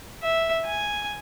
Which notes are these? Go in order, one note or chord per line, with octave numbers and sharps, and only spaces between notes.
E5
G#5